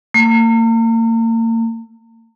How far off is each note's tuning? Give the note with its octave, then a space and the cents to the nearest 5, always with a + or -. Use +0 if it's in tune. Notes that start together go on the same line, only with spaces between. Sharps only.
A#3 -40